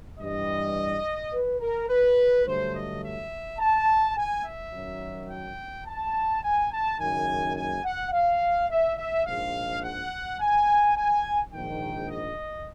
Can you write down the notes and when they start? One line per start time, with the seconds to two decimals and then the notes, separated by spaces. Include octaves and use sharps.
0.20 G2 E3 G3 D#5
1.33 B4
1.61 A#4
1.89 B4
2.46 G2 D3 F#3 A3 C5
2.74 D#5
3.03 E5
3.59 A5
4.16 G#5
4.45 E5
4.72 F#2 D#3 F#3
5.29 G5
5.86 A5
6.43 G#5
6.72 A5
7.00 F#1 F#2 D#3 G#5
7.56 G#5
7.84 F#5
8.13 F5
8.70 E5
8.98 E5
9.26 A#1 G#2 F3 F5
9.83 F#5
10.40 G#5
10.96 G#5
11.52 A#1 G#2 D#3 G5
12.09 D#5